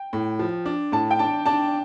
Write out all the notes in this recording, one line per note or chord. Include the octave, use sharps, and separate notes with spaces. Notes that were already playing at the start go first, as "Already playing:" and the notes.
Already playing: G5
A2
F3
D4
A2 A5
G5
D4 A5
D4 A5